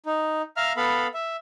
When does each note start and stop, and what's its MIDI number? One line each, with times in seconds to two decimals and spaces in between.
0.06 0.42 63
0.57 0.73 76
0.57 0.73 77
0.57 0.73 82
0.57 0.73 89
0.77 1.07 59
0.77 1.07 69
0.77 1.07 77
0.77 1.07 83
1.14 1.36 76